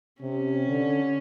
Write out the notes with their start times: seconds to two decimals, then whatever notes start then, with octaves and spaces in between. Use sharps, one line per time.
0.21 C3 C#4
0.68 D3